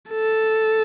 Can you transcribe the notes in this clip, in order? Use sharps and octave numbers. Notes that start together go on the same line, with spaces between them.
A4